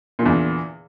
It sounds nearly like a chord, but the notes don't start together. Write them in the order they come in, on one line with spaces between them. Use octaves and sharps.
A#2 D3 E2